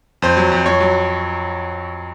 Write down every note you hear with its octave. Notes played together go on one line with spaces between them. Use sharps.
F2 C5
F#3
F2
F2 C#5
F#3